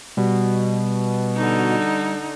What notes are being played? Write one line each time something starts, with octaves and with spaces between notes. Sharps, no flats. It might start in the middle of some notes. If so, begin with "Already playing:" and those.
B2 G3
D3 D#4